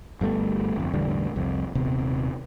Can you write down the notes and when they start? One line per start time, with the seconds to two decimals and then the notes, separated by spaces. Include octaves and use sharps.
0.21 G1 G3 A3 B3
0.76 G1 F2
0.94 E1 A1 D3 G3
1.36 C2 F2
1.75 D#1 C3 B3